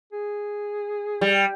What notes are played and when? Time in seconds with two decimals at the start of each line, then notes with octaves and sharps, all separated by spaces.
0.12 G#4
1.21 G3